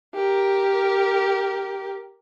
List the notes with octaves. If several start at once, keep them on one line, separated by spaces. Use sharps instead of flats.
G4 A#4